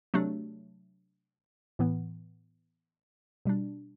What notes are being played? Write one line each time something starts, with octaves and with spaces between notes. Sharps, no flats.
C3 F#3 A3 D4
A2 E3 B3
B2 G3 D4